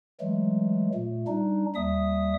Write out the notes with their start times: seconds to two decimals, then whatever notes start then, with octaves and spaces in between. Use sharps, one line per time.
0.21 E3 F#3 G#3 A3
0.94 A#2 A3
1.27 G3 D4 D#4
1.75 D#2 G3 E5 D#6